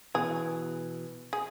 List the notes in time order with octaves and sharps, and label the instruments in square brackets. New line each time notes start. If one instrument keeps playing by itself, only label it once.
[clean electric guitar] B2 E3 [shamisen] G#4
[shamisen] G#4